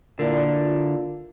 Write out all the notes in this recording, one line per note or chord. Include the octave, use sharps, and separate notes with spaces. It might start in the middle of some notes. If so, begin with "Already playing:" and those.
A#2 D3 A#3 E4 D5
F4